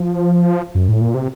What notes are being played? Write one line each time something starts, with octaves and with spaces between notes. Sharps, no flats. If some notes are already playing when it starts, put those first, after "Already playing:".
Already playing: F3
F#2
A2
A#2
C3